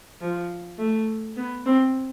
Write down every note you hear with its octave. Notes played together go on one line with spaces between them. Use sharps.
F3
A3
B3
C4